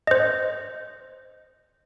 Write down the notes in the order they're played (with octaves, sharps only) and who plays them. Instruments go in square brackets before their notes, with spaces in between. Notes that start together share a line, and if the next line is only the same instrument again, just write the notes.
[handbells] C5 D#5